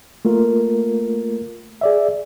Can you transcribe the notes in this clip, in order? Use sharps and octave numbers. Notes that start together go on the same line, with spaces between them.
A3 A#3 F4 A#4
G#4 D5 E5